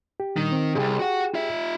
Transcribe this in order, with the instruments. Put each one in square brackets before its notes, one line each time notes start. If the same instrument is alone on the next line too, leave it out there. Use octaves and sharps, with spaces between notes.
[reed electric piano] G4
[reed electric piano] A#2 G3 D4 [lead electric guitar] D#3
[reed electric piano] C4
[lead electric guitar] C2 G#2 [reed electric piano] G4 G#4 G5
[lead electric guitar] F#4 F#5
F4 E5